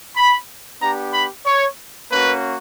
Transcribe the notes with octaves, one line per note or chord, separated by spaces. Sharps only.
B5
B3 D4 G4 A#5
B5
C#5
A#3 C#4 F#4 B4